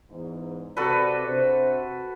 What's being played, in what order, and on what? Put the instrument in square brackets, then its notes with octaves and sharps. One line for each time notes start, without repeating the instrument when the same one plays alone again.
[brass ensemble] E2 G#2
[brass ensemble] C3 D5 [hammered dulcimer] F#4 A4 B4
[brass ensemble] C3 D4 C5